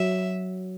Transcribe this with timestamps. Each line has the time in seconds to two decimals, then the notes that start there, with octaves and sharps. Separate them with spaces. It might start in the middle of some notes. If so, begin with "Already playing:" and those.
Already playing: F#3 E5